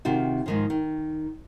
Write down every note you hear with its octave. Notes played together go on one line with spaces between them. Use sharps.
C3 D#3 F4 F#4
G#2 D#3 F3
D#3